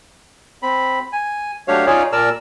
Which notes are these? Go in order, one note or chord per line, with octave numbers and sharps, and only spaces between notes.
C4 B5
G#5
F#3 A3 D4 G4 C#5 F5
C#4 D#4 F4 G#4 C#5 D5
A#2 A#4 D5 A5 E6 F6